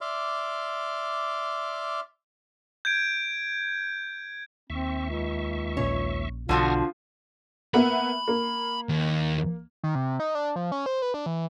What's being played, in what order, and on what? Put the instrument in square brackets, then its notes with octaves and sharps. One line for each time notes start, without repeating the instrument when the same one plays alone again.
[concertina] D5 E5 C6 D6 F6
[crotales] G6 G#6 D7
[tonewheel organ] D#2 E5 C#6 [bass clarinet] C4
[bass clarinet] C#2
[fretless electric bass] A#1 A#2 C#4 [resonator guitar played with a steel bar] C#5
[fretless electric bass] B1 [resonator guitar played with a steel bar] D3 F3 F#4 [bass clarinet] F4 [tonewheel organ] C#6 D#6 F6
[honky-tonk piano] A#3 B3 E5 [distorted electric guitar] B5
[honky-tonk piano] A#3
[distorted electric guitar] D#2
[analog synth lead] D#3
C3
D#4
D4
F3
C#4
C5
B4
D4
E3